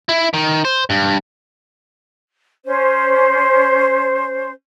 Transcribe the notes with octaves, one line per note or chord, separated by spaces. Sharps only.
E4
D#3
C5
G2
C#4 C5